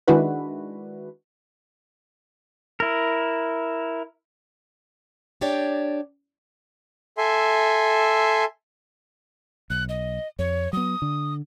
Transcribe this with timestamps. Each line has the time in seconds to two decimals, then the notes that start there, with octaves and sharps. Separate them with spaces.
0.08 D#3 G#3 D4 E4 F#4 B4
2.80 E4 A#4
5.41 D4 G4 C#5 D5
7.18 A4 E5 G#5 C6
9.70 B1 F#6
9.89 D#5
10.39 F2 C#5
10.73 F#3 B3 D#6
11.02 D3